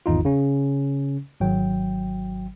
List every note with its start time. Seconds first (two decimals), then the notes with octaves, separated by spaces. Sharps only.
0.06 G#1 E2 D#4 F4
0.25 C#3 C#4
1.41 G#1 F#3 G5